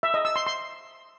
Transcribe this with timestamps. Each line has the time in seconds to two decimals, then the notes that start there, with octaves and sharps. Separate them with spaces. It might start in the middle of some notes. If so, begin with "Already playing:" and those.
0.03 E5
0.14 D#5
0.25 E6
0.36 C6
0.46 C6